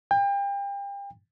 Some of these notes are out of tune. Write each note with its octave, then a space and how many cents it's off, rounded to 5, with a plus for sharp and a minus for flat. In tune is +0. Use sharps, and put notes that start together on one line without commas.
G5 +35